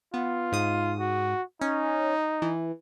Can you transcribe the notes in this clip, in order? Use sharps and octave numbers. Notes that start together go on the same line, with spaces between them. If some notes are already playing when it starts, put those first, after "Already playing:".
B3 F4
G#2 D#6
F#4
C#4 D#4
E3